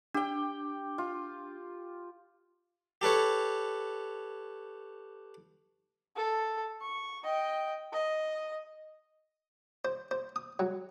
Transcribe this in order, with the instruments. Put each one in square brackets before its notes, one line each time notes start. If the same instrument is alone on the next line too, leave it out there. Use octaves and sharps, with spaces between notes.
[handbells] D4 [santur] G4 G5
[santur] F4
[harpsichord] G4 A4 B4 C#5
[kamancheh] A4
C#6
D#5 G5
D#5
[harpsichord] C5
C5
D#6
F#3